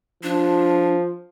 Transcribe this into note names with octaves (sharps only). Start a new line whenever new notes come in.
F3 D4